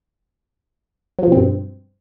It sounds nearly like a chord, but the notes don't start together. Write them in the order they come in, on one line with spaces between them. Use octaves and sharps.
F#3 F3 B2 C4 G2